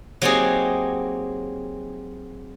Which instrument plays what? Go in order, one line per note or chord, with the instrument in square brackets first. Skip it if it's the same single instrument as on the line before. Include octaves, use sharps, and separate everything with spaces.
[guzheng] F#3 A#3 C4 D#4 G4 G#4